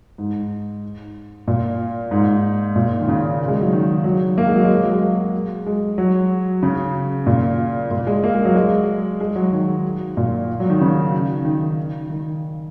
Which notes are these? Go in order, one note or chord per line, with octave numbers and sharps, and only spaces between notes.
G#2
A#2
G#2
A#2
D#3
C#3
G#3
F#3
D#3
F#3
A#3
G#3
F#3
G#3
F#3
G#3
A#3
G#3
F#3
C#3
A#2
A#2
G#3
A#3
G#3
F#3
G#3
G#3
F#3
D#3
A#2
F#3
D#3
C#3
D#3
D#3